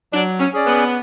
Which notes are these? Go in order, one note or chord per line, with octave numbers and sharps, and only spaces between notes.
F#3 D4
C#4
C#4 G#4 D5
B3